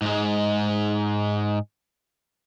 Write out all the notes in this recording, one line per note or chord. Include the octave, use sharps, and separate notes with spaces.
G#2 G#3